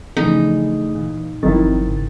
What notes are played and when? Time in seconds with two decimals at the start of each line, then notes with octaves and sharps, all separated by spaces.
0.17 C#3 E3 F3 A3 D4 D#4 G#4
0.95 A#2 E3
1.43 G1 D#3 F3 F#3 C4 E4 A6
1.80 G#2 C#3